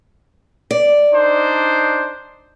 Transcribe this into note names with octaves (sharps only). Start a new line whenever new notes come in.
D5
D4 D#4 C5